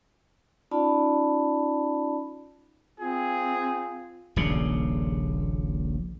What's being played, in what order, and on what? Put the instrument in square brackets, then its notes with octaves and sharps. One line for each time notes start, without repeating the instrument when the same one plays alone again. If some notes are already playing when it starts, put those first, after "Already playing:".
[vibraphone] C#4 D#4 F4 D5 A5 B5
[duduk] C4 [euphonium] F4 [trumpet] G#4
[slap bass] D#1 A#1 A#2 C#3